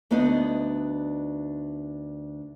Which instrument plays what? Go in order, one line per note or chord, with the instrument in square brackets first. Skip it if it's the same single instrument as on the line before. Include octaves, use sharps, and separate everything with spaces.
[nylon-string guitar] D2 B3 D4 D#4 D#5